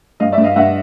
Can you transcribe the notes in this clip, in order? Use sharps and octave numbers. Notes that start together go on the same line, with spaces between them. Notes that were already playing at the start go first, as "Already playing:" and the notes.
G2 D#5 F5
D5 E5
G2
D#5 F5
G2 E5 F#5